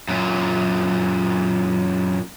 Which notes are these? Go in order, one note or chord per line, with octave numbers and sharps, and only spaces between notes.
F#2 A#2